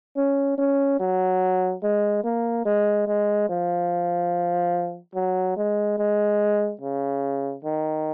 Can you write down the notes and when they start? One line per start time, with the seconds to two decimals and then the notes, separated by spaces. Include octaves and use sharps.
0.17 C#4
0.58 C#4
1.00 F#3
1.83 G#3
2.24 A#3
2.65 G#3
3.07 G#3
3.49 F3
5.15 F#3
5.57 G#3
5.98 G#3
6.81 C#3
7.64 D#3